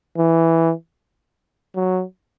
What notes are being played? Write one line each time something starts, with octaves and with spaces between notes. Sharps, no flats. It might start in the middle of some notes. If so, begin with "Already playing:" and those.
E3
F#3